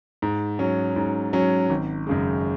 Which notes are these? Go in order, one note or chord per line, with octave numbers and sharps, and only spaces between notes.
G#2
F#3 C#4
G#2
F#3 C#4
G#1
F#2 C#3 G#3